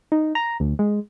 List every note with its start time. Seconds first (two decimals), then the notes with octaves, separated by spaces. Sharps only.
0.12 D#4
0.35 A#5
0.60 D2
0.79 G#3